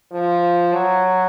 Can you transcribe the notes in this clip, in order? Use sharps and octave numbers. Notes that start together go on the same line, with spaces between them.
F3
F#3